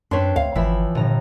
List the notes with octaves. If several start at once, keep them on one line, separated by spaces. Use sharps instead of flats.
F#2 C4 D4 B4 C#5 C6
D2 F5
G1 E3 F3 E5 B5
G1 A#2 A#5